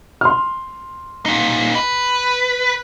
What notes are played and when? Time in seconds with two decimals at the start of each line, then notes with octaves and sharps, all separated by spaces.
0.21 C6 F6
1.26 A#2 D#4
1.75 B4